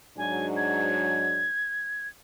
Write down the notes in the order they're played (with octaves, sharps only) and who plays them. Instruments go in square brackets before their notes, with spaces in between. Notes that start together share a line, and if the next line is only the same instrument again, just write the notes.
[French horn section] G#2 F#3 D4 [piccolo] G#5
[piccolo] G#6